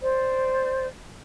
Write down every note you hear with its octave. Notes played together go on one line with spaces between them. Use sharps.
C5 D5